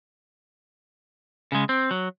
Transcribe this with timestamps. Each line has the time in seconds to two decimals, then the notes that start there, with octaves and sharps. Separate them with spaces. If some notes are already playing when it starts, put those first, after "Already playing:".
1.52 C#3 G#3
1.69 C4
1.91 F#3